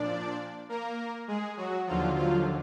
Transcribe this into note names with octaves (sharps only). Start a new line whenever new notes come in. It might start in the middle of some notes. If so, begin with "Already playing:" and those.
Already playing: A#2 F3 D4 D5
A#3 A#4
G#3 G#4
F#3 F#4
D#2 D3 F3 F#3 F4
F3 F4